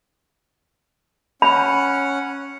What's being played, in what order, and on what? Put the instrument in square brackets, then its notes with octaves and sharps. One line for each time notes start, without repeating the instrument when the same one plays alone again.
[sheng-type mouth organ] C#4 F#5 [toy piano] B5